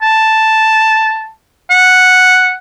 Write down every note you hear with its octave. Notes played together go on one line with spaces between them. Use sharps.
A5
F#5